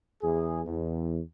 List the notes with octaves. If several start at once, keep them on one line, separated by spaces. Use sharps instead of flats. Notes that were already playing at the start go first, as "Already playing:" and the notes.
E2 G#4
E2